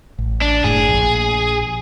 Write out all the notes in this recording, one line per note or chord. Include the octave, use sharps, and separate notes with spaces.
A1
D4
F#1 A2 G#4
A#1